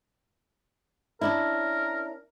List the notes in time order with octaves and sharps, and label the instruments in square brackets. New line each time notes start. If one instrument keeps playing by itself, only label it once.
[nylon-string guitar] C#4 D4 E4 [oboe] A#4